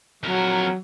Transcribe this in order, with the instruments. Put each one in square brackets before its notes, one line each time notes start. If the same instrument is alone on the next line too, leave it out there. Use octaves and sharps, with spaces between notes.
[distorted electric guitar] F2 A#4 [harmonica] F#3